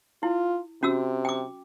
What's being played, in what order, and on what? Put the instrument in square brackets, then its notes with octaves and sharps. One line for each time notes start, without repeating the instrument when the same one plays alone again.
[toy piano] E4 [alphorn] F4
[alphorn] C3 [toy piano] C#4 F#4 E6
[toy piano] G5 D6